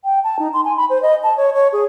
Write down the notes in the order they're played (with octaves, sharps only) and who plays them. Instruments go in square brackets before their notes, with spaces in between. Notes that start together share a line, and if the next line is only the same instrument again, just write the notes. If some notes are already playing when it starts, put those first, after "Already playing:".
[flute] G5
A5
D#4
C6
G#5
B5
C5
D#5
A5
C#5
C#5
G#4